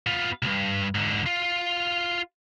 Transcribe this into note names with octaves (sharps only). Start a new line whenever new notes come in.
B3 F4
C2 G2
G#2 D3
F4